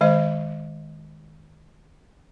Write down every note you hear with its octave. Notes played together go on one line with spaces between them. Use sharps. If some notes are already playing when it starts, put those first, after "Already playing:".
D#3 G#3 C5 D#5